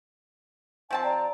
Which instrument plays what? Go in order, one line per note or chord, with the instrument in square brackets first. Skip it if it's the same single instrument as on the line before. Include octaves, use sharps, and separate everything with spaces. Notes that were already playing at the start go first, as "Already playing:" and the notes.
[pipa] F3 C4 A5 [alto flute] G#5
[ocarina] D5 [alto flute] A#5